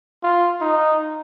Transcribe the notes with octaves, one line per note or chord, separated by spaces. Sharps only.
F4
D#4